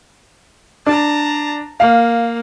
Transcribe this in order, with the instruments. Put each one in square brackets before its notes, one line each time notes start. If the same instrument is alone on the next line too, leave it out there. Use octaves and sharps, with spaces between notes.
[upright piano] D4 [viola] A5 A#5
[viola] A#3 [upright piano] F5